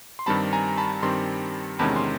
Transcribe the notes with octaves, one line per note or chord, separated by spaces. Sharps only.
C6
G2 D#3 G3 C4 A5 B5
G#5 A#5
A#5
A5 B5
G2 D#3 G3 C4 A#5 C6
E2 C3 D#3 G#3 C#4 A5 B5
C6